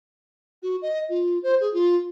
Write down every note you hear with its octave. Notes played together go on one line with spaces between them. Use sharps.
F#4
D#5
F4
C5
G#4
F4